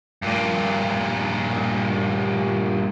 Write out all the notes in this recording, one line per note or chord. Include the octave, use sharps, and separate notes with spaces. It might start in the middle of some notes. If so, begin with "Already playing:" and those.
G2 A#2